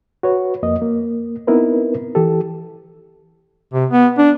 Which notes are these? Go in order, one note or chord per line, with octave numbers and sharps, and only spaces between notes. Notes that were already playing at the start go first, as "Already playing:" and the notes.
F#4 B4 C#5
F2 A#3 D#5
A#3
B3 C4 D#4 E4 A#4 B4
E3 G4 A4
C3
B3
D4